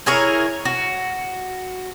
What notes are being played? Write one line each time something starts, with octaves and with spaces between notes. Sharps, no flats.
E4 G#4 A#4 C#5
F#4